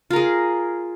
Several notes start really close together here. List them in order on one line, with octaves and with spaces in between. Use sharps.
F4 A#4 G#4